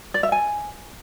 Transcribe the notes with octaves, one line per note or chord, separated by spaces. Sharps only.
D5
E5
G#5